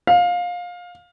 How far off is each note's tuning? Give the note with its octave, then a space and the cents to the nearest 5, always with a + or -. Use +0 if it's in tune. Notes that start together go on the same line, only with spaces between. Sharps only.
F5 +20